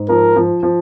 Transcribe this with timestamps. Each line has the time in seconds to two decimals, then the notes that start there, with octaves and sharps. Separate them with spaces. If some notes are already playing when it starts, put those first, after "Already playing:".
Already playing: G#2
0.09 F3 A#4
0.36 F3
0.63 F3